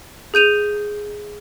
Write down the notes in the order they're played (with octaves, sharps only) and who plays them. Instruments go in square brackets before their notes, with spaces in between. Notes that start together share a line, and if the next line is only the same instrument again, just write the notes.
[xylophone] G#4 G6 D#7 F7